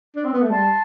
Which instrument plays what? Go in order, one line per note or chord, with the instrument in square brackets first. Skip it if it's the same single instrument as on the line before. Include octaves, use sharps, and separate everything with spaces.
[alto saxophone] D4
C4
B3
A3
[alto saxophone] G3 [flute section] A5 C6